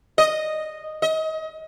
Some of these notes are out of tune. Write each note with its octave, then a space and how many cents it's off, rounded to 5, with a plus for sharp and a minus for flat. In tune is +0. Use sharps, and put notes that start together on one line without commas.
D#5 -5
D#5 +30